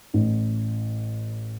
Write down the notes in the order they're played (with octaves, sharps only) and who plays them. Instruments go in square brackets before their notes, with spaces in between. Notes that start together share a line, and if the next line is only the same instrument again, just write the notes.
[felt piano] A1